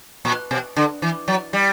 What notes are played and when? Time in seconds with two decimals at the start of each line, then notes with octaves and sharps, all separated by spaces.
0.25 A#2
0.51 B2
0.76 D3
1.02 E3
1.28 F#3
1.53 G3